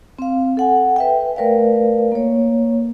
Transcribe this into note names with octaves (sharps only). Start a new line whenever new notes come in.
C4 F5
A4 F#5 G#5
B4 E5 G5
A3 A#4 B4 D5 F5
A#3 C#5